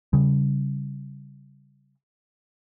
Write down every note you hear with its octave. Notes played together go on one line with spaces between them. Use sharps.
C#3 G3